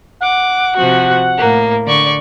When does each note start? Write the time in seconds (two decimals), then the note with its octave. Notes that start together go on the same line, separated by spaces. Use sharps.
0.22 F#5 D6
0.76 C3 F3 F#4
1.37 A2 A#3
1.86 D3 D5 C#6